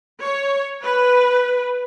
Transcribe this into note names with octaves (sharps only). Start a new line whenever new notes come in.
C#5
B4